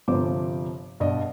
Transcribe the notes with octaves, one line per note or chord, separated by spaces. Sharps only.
G1 C3 F3 C5 D6
G2 B2 D5 D#5